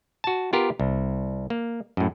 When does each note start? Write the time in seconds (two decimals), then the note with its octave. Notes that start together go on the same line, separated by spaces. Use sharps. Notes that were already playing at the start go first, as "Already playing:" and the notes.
0.24 F#4 A5
0.53 B3 F4 G4 A#4
0.80 C2
1.50 A#3
1.97 F#2 A2